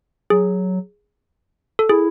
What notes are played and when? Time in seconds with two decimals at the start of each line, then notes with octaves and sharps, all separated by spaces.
0.30 F#3 G#4
1.79 A4
1.89 E4 G#4